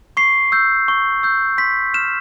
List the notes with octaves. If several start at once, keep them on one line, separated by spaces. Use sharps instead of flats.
C#6 C7
E6 G6
C#6
E6 G6
C6 B6
F6 E7